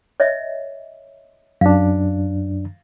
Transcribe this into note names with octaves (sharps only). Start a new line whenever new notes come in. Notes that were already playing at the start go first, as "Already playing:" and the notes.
C#5 D#5 E5
F#2 D4 F5